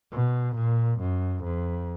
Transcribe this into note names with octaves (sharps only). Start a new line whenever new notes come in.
B2
A#2
F#2
F2